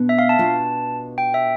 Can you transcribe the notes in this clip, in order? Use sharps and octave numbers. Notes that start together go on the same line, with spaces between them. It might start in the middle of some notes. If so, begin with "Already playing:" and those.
Already playing: B2 B3 D4
E5
F5
A5
B2 B3 D4 F4
G5
E5